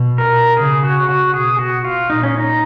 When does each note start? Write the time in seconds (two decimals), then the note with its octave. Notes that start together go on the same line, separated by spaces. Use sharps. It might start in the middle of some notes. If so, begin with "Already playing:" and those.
Already playing: B2
0.18 A#4
0.57 C#3 G#4
0.83 F#4
1.09 F#4
1.34 B2 G#4
1.59 F#4
1.84 F4
2.10 A#2 D#4
2.23 C#4
2.38 D#4